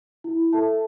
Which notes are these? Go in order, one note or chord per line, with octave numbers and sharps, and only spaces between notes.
E4
A4 E5 A5